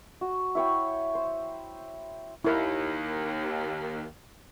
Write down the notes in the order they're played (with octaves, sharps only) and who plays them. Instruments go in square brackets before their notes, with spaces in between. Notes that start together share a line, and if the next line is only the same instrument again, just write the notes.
[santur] F#4
E4 C#5 G5
C5
[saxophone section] D#2 [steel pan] E4 A#4